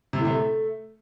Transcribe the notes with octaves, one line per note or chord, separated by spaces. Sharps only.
C3
A2
C3
A3